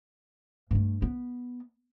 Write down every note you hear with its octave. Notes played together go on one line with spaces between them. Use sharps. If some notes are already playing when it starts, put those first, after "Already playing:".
G2 A3
B3